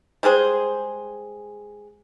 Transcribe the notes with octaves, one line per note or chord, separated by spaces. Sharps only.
G3 G#3 G#4 C5